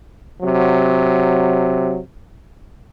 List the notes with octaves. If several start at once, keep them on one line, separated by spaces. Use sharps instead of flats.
C3 F#3